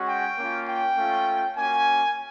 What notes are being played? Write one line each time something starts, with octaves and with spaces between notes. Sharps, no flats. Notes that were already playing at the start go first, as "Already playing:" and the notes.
Already playing: G#3 C#4 F#4
G5
A#3 C#4 F4
G5
A3 C#4 F4
A#3 C#4 F#4 G#5